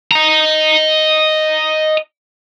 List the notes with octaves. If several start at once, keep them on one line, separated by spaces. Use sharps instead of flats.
D#5 A#5